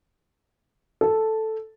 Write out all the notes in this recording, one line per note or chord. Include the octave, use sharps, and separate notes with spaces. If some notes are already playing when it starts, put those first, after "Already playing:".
A4